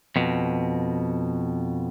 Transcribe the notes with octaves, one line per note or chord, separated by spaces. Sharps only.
F2 B2